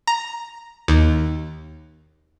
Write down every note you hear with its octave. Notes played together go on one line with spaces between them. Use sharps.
A#5
D#2